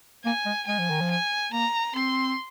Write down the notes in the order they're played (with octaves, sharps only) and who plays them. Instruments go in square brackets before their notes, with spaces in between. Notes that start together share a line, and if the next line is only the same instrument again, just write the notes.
[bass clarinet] A#3 [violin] G#5
[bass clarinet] G#3
[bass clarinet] G#3 [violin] G#5
[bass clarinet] F3
D#3
F3
[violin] G#5
[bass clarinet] A#3 [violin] A#5
[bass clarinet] C4 [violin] C6